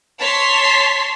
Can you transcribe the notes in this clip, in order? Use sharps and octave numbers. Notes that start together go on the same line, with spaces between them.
C#5 A5 C6 B6